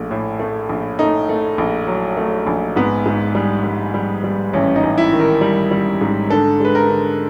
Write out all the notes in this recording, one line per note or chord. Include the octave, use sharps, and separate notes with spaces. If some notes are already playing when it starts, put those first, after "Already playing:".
Already playing: A#1 A3
A2
A3
A#1
A3 D#4
A3
A#1
F#3
A3
A#1
G#2 B3
G#2
G3
G3
G3
G3
A1 C#4
D#4
A1
E4
D#3
A#4
G3
G3
G#2
D3 A4
G#3 B4
A#4
D3